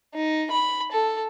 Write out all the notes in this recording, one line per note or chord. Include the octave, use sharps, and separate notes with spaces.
D#4
B5
A4